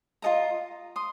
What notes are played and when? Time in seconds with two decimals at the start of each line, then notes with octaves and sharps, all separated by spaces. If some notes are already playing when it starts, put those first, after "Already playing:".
0.22 F4 A4 D#5 A#5
0.96 C6 D#6